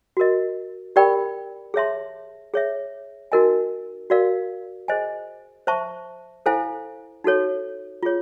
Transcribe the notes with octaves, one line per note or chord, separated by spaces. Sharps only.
F#4 A#4 D#5
G4 A#4 D5 G5 B5
G#4 C#5 E5 A5 C6
G#4 C#5 E5
D#4 F#4 A#4 D#5 G#5
F#4 A#4 D5 F5
G#4 C5 D#5 G#5
C5 E5 A5 C#6
E4 A4 C5 F5 G#5
D#4 F#4 A4 C#5
F4 G#4 C#5